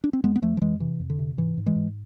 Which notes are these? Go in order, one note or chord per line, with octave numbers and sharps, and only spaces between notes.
D4
C4
F2 G#3 B3
B3
F2 F3 A3
F3
F2 E3 G#3
C3 E3
F2
D3
C3
G#2 E3
G#2
E3 G#3
G#2